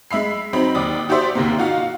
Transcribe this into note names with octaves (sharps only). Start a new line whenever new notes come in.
G#3 E5 B5 C7
F#3 C4 D#4 B5
D#2 D5 D6 D#6
F#4 G4 C5 D5 E5 C6
D#2 C3 A#3
D#4 F4 F#4 F5